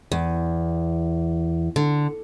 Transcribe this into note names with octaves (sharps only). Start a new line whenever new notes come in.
E2
D3